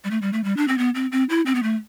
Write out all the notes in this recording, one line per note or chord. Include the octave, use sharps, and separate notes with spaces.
G3
A3
G3
A3
G3
D4
C4
B3
C4
C4
E4
C4
B3
A3